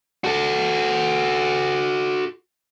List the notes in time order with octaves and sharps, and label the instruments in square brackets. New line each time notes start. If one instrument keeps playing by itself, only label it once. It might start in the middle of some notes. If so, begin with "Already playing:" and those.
[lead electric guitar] F#4 A4